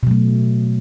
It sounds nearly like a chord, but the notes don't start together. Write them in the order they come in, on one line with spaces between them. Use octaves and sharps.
B2 F#3 A3